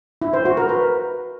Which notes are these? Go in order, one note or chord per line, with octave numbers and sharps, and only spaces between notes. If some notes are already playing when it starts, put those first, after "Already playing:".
E4
C5
F#4
A#4
B4